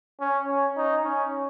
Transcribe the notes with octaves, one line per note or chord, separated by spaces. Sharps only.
C#4
C#4
D#4
C#4